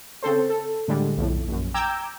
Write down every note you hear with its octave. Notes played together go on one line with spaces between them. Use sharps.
C#3 C4 A4 C5
A4
A2 D3 G3 G#3
B1 F2 A2
A#1 F#2
G5 A#5 D6 E6 G6 G#6